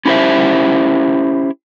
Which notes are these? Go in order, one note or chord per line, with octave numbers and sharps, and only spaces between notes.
C#4 E4 G4 C5 E5